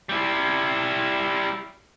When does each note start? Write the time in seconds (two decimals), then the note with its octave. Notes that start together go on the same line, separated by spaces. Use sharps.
0.09 G3 E4